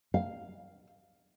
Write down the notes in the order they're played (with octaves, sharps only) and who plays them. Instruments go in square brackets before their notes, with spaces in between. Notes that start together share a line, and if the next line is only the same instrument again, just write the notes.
[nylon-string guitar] F5